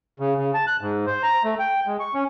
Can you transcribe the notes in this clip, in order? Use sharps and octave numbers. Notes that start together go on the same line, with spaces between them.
C#3
C#3
A5
F#6
G#2
C5
A#5
A3
G5
G#3
C#6
C#4